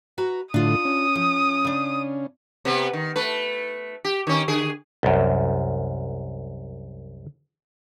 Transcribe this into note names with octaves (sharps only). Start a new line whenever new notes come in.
F#4 B4 A#5
A2 D3 D4 F4 D#6
C#4
F3
C#3 D4
C3 B3
D#3
A3 B4
G4
D#3 C#4
D3 G#4
C2 F#2